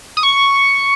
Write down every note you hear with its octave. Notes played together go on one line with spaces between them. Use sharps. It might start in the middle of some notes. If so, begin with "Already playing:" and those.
D#6
C#6